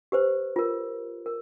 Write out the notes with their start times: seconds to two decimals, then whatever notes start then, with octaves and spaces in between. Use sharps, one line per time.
0.12 G4 B4 C5
0.56 F4 A#4
1.26 A#4